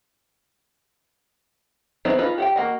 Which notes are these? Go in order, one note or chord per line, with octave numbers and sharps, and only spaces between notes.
F#3 B3 C4 D#4 E4
C#4 D#4 F4 B4
G4 F#5 G5
A#3 F#4 D#5